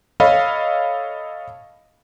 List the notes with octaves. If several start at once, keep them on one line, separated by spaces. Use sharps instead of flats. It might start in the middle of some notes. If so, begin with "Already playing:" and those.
A4 C#5 D#5 F5 B5